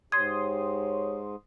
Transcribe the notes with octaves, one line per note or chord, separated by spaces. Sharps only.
G#2 G4 C#5 C6 D#6 G#6